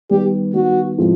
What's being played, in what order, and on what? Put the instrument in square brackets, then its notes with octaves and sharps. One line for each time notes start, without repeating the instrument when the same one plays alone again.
[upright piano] D#3 G3 B3 [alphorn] G4
[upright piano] D#3 G3 B3 [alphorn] F#4
[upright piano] A2 F3 G#3 C4 E4